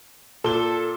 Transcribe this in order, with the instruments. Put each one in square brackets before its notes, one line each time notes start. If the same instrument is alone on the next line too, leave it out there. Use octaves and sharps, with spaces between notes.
[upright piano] A#2 G7 [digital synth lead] A4